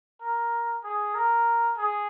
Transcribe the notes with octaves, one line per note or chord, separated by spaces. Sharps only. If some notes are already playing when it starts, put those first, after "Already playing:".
A#4
G#4
A#4
G#4